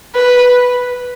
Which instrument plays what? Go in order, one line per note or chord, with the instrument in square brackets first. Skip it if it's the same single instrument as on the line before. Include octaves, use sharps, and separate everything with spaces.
[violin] B4